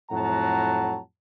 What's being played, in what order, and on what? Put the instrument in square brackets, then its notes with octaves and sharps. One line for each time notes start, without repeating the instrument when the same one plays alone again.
[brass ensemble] F2 A2 F#3 F#5 A5 A#5